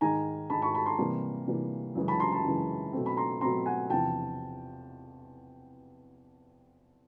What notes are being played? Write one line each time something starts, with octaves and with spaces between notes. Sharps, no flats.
G#2 D#3 G#3 G#5 A#5
G#2 D#3 G#3 A5 B5
B5 C#6
A5 B5
A#5 C6
C3 E3 G3 A#3
C3 E3 G3 A#3
F#2 C#3 E3 G#3
A5 B5
A#5 C6
A5 B5
F#2 C#3 E3 G#3
B2 F#3 A3 C4
B5
A#5 C6
B2 F#3 A3 C4 A#5 C6
F#5 G#5
E2 C3 F3 G5 A5